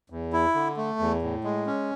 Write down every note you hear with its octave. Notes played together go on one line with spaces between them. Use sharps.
E2
E4
D3
A3
E2
A2
G#3
C#4